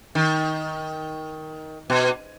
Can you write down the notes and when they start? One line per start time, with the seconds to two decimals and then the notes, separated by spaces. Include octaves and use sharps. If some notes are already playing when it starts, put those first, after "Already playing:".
0.15 D#3
1.90 B2